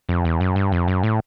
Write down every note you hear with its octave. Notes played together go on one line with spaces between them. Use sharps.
F2
E2
F#2
G2
F2
F#2
A2